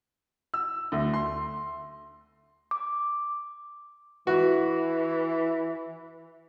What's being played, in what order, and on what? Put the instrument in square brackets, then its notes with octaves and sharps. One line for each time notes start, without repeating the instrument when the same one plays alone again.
[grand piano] E6
D2
C6
[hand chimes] D6
[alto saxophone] E3 [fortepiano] F#4